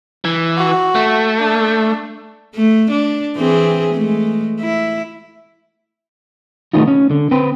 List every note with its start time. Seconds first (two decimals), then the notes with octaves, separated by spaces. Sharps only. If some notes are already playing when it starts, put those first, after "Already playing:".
0.25 E3
0.58 F#4
0.95 A3
1.39 D4
2.55 A3
2.91 D4
3.36 E3 C4 G#4
3.95 G#3 A3
4.60 E4
6.73 D#3 A3 B3 C#4 D#4 F4
6.88 C#4
7.11 D3
7.31 C4 B4 G5